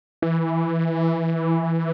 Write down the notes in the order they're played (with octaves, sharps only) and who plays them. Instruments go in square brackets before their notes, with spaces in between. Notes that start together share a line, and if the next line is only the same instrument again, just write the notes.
[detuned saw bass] E3